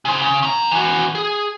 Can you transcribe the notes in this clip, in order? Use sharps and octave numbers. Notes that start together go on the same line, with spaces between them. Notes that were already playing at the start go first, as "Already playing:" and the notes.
C#3 C5
C#3
C#4 A#5
E3 F#4
G#4